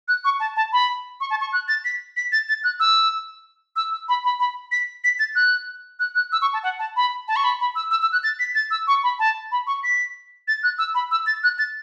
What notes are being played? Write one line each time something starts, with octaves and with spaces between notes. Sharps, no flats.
F#6
C#6
A5
A5
B5
C#6
A5
C#6
F#6
A6
B6
B6
A6
A6
F#6
E6
E6
E6
B5
B5
B5
B6
B6
A6
F#6
F#6
F#6
E6
C#6
A5
F#5
A5
B5
A5
C#6
B5
B5
E6
E6
E6
F#6
A6
B6
A6
E6
C#6
B5
A5
B5
C#6
B6
A6
F#6
E6
B5
E6
A6
F#6
A6